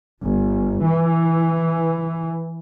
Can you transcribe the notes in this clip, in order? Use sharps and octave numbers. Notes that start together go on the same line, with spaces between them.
G1
E3